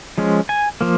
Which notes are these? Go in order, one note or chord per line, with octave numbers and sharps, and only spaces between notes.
F3 G#3 C#4
G#5
F3 A#3